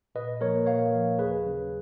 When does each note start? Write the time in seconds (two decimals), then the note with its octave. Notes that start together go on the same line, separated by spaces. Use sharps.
0.15 A#2 B4 D#5
0.41 F3 A#3 A#4 C#5
0.66 A#2 C#5 F5
0.93 F3 A#3
1.19 D#2 G#4 B4
1.45 C#3 F#3 C#4